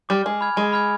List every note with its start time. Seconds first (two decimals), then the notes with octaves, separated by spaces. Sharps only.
0.09 G3 D6 F6
0.25 G#3 G#5
0.41 B5 F6 G#6
0.57 G#3 G#5
0.72 B5 F6 G#6